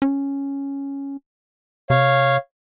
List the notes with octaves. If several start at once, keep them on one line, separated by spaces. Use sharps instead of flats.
C#4
C3 C#5 F5